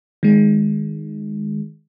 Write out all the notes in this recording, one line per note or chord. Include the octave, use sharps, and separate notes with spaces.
D#3 G#3